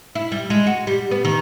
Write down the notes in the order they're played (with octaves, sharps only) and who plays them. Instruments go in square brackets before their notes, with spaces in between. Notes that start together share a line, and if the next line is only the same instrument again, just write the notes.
[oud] E4
G3
G#3
F#4
G3
B3
D#3